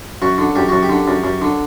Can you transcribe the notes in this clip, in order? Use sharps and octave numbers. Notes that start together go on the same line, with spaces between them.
F#2 F#4
D3
F#2 G4
F#2 F#4
G4
D3
F#2
F#2
D3